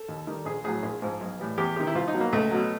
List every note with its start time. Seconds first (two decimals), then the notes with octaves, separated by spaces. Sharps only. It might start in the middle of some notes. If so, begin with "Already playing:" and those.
Already playing: A4
0.08 D#2
0.27 D#3 G3
0.45 A#1 G#4
0.64 A2 F#3 G#4
0.83 A#1 G#4
1.02 G#2 F3
1.21 B1
1.40 A2 E3 G3
1.57 E2 G4
1.76 C3 D#3 G4
1.87 E4
1.95 C2 F4
2.08 D#4
2.14 B2 F#3
2.20 A#3
2.32 C#2 A3
2.51 B2 F#3